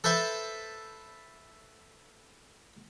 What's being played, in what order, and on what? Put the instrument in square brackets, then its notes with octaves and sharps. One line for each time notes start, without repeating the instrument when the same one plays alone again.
[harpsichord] A4 B4 C5 E5 A5